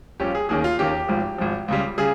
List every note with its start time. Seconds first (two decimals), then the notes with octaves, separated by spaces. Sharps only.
0.20 A#1 A#2 G3 C#4 G4
0.35 G#4
0.49 D#2 D#3 A#3 C#4 G#4
0.64 F4
0.79 D#2 D#3 A#3 C#4 G4
1.09 G#1 G#2 F3
1.38 G#1 G#2 F3
1.68 C#2 C#3 G3
1.98 C#3 G3 G#4